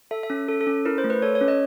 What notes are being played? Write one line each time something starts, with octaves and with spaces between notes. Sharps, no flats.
A4 E5
E5
C#4
A4
A4
C#4
E4 A#4
C5
A3
B4
A4 C#5
C#5
C#4
D#5